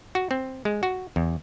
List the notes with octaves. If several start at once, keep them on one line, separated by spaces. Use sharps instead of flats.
F#4
C4
G#3
F#4
E2